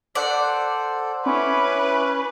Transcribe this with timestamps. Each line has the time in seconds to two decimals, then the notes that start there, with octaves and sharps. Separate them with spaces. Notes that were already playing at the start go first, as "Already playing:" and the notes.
0.15 A4 C5 D5 F#5
1.26 C#4 E4 B4 D6